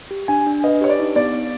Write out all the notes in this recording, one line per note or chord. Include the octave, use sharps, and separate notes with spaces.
G4
D4 G#5
D4
B4 D#5
G4 C#5
D5
D#4
B3 D5
B3